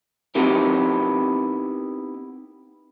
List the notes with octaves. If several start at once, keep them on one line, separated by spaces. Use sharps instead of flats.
B3 C4 D#4 E4 G4 A#4